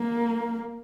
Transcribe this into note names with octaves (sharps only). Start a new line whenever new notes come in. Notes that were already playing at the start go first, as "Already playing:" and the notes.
Already playing: A#3